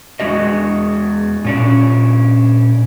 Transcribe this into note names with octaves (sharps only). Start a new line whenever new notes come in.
E2 G#3 D4 F#4 D#5
A#2 C#4 D4